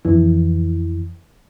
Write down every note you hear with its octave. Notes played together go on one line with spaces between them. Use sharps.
F2 E3